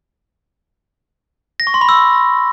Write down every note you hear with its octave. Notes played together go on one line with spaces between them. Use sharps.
A#6
C#6
C6
B5
E6